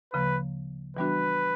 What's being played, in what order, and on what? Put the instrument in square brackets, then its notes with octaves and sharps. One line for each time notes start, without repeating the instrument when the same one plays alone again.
[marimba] D2 C#3 F3 A#3 [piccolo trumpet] B4
[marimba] E3 G3 B3 D4 F#4 [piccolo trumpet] B4